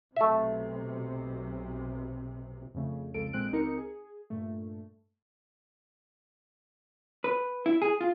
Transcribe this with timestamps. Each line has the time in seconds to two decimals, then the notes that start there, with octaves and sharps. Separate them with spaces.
0.16 B1 C3 A3 E5
2.75 F2 C#3 A3
3.14 C2 F2 C#3 G#3 A4 D7
3.33 A#1 A#2 G#3 C4 F#6 D7
3.52 C#2 C4 D#4 G4 A#4 C#7
3.78 G#4
4.30 G2 A#2 A3
7.24 B4
7.66 E4
7.82 G#4
8.01 F4